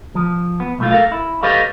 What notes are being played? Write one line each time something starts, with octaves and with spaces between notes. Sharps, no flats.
F3
B3
B1 A2 A3 F4
A4 A#4 F5
E4
G4 A4 B4 C#5 D#5 F5